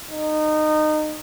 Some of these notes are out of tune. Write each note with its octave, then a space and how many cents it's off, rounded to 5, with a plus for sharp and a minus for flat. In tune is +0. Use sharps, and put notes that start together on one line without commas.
D#4 -25